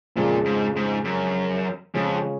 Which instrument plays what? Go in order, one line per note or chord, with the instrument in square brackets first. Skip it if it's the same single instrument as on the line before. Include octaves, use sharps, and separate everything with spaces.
[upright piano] F2 C#3 F3 G#3 [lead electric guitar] A#2
[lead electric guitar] G#2
G#2
F#2
[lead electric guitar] F2 [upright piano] C#3 G#3 C#4 F4 G#4